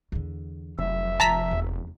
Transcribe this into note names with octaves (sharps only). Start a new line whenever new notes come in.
E2 D3
F1 F#3 E5
F3 A5 A#5 B6
E2